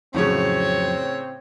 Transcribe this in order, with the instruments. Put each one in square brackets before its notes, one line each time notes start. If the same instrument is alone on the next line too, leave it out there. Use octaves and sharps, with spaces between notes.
[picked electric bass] F2 F#3 [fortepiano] A2 C#3 [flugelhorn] C4 [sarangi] C#5